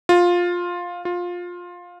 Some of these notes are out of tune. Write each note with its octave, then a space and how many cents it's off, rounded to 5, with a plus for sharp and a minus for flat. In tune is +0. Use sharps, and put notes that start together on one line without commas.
F4 +10
F4 +15